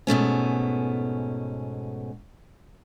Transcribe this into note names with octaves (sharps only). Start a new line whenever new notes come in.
G#2 B2 A3 C#4